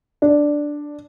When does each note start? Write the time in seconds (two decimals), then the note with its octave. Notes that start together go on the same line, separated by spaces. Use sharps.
0.22 D4